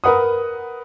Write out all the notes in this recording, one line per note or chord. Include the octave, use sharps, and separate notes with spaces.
A#4 B4 F#5 D#6